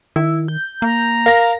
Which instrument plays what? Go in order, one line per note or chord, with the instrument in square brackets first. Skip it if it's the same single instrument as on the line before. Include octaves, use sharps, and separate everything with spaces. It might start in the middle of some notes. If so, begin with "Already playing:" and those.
[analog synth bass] D#3 [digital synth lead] E4
[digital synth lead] G6
[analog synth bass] A#3 [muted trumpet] A#5
[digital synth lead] A#4 [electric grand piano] F5 A#6